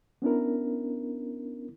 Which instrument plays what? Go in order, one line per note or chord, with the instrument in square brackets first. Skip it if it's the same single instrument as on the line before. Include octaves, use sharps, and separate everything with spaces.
[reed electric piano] B3 C#4 D4 E4 A#4